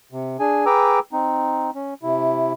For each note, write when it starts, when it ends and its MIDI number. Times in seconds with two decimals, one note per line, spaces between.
0.12 0.37 48
0.40 0.65 62
0.40 0.65 68
0.40 0.65 80
0.66 0.99 68
0.66 0.99 71
0.66 0.99 79
0.66 0.99 82
0.66 0.99 86
0.66 0.99 88
1.12 1.70 60
1.12 1.70 63
1.75 1.94 61
2.03 2.53 48
2.03 2.53 64